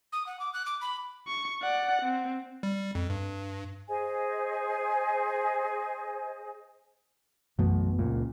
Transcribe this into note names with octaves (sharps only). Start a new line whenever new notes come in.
D#6
F#5
D6
F#6
D6
B5
C#6
D5 F#5
C4
G3
F2
G2
G#4 C5 D#5 G#5
B1 F#2 B2 E3 A3
C#2 A#2